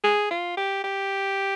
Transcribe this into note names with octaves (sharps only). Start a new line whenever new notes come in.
G#4
F4
G4
G4